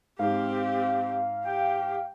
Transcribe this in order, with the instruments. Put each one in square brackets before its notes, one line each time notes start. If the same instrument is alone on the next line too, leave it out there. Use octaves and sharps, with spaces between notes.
[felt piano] G#2 [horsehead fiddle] C4 G4 [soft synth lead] F5
[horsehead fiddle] G4 [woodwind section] G5